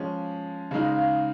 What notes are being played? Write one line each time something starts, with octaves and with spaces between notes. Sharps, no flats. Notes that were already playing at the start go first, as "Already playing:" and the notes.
Already playing: F3 G#3 C#4 F5 G5
C#3 G#3 D#4 F5
D#5
F5